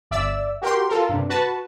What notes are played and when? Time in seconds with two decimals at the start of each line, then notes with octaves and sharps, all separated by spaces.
0.11 G1 D5 E5 E6
0.62 F#4 G4 A#4 G5 C6
0.89 F4 A4 A#4
1.09 G2 C3
1.29 F#4 B4 A5